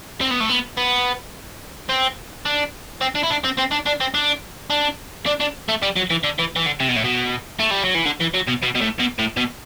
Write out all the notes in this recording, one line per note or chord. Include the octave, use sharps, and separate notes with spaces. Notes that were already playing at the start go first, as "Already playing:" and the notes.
C4
B3
A3
B3
B3
C4
D4
C4
D4
E4
D4
C4
C4
D4
D4
C4
D4
D4
D4
D4
A3
G3
F#3
E3
D3
E3
E3
D3
C3
B2
A2
B2
A3
G3
F#3
E3
D3
E3
F#3
B2
B2
B2
A2
B2
A2
B2